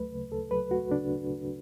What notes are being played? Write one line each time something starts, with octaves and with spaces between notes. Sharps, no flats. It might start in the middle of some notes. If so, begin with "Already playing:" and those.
Already playing: D2 F#3 A3 B4
C#3
D2 A4
F#3 B4
A3 F#4
C#3 D4